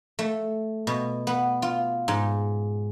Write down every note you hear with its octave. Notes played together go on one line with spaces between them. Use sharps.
A3
B2
B3
F4
G#2